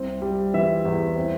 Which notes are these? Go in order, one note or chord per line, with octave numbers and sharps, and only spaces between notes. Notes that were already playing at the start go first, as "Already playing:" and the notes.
Already playing: C2 C4
G3
E3 E5
E2
C4